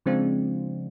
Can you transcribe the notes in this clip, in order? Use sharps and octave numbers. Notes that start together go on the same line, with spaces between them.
C#3 F3 G#3 C4 D4 F4